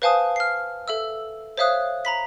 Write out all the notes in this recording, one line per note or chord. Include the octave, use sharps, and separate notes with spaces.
B4 C5 F5 G#5 A5 D#6
F6 C7
A4 E5 E6
C5 C#5 E5 F5 D#6 F#6
A#5 B5 B6